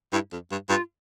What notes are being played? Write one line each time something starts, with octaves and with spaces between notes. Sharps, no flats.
G2 E4
F2
G2
G2 F4